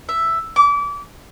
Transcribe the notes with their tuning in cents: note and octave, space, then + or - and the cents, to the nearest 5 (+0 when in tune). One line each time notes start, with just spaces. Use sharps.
E5 +5
D6 -30